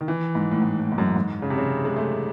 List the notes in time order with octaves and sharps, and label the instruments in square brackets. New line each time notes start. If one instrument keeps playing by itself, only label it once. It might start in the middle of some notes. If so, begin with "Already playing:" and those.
[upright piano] D#3
E3
G#2
A2
G#2
A2
G#2
F#2
G#2
C#3
C3
C#3
G#3
A3